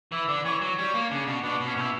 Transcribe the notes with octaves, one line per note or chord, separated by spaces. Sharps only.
E3 E4
D3 D5
E3 C#5
F#3
G3 C#5
A#3
C#3 D4
B2
B2 D4
B2
C#4
B2 E4